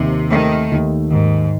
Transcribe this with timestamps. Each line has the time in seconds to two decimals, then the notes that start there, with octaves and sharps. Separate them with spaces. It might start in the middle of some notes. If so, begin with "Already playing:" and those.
Already playing: D#2 C3
0.32 D#3 A3
0.72 D#2
1.10 G#2 D#3